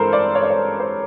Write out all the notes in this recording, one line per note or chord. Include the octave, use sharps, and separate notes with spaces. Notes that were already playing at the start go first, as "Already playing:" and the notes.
Already playing: G2 E3 G#3 A4 A#4 C5
D5
C#5
D5
C#5
C5